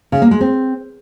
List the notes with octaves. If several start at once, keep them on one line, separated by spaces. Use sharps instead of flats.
C#3
A#3
G#3
C4